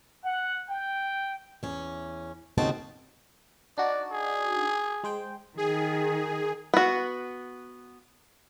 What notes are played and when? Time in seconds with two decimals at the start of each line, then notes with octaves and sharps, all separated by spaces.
0.24 F#5
0.69 G5
1.63 E2 C#4
2.58 D#2 C#3 C4 D#4 F#4 A5
3.78 D4 D#4 F#4 D5
4.11 G#4
5.04 G#3 C5 G5
5.57 D#3 G#4
6.74 B3 F#4